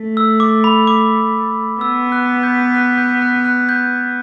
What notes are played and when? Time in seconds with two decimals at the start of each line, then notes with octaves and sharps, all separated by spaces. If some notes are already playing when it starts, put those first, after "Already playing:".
Already playing: A3
0.17 E6
0.40 D6
0.64 B5
0.87 D6
1.81 B3 E6
2.12 F#6
2.43 G6
2.74 F#6
2.98 G6
3.22 F#6
3.45 F#6
3.69 G6